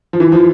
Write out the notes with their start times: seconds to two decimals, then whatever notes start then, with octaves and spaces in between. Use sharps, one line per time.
0.13 F3
0.20 E3
0.32 F3